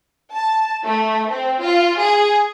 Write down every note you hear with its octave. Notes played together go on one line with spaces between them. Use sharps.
A5
A3
C4
F4
G#4